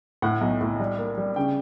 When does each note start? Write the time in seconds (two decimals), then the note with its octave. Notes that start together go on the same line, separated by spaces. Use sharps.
0.22 A2 F#5
0.41 B1
0.61 A2
0.80 G3
0.98 A#3
1.18 G3
1.36 C#3 G5